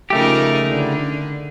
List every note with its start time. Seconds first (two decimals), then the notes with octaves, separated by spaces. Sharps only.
0.10 C#3 F3 A3 D#4 G4 A#4
0.65 D3